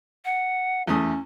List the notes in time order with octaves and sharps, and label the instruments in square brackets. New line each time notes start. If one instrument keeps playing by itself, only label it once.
[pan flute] F#5
[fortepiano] E2 A3 D#6 [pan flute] C#4